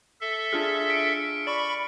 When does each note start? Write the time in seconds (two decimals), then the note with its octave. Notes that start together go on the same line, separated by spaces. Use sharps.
0.21 A4 E5
0.53 D4 F4 G#4 F6
0.90 B6 C#7 D7
1.47 D5 B5 C#6